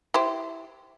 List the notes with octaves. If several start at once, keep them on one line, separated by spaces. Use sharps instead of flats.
E4 G4 C5